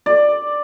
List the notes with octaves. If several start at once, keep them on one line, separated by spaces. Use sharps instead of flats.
D5